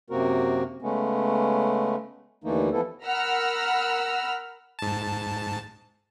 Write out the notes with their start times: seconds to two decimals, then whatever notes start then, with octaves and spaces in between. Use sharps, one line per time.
0.10 F#2 C3 A#3 C4 F#4 A#4
0.82 C#3 G#3 A3 B3 C#4
2.44 D#2 D3 E3 A3 A#3 D#4
2.72 E3 F3 B3 E4 A4
3.05 A#4 F#5 B5 E6 F6 A#6
4.79 G#2 A5